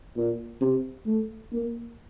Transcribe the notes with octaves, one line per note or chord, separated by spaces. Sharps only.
A#2
C3
A3
A#3